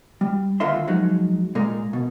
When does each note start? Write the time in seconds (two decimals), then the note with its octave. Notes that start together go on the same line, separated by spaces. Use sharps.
0.21 G3
0.60 D#2 D3 F4 A#4 E5 C6
0.87 F3 F#3 G#3 D#4
1.55 A#2 G#3 A#4
1.93 B2